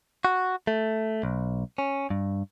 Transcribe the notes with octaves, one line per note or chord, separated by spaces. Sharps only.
F#4
A3
B1
C#4
G2